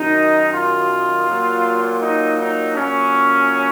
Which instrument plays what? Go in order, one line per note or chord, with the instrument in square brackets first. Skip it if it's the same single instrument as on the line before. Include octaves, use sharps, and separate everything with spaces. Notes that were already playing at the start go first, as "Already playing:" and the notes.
Already playing: [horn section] F#2 D#3 F#3 D#4
F4
A#2 F#3
D#4
D#4
A#2 F#3 C#4